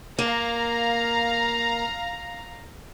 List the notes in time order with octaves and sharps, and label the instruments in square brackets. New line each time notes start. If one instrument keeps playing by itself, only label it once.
[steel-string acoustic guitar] A#3 [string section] F5 A#5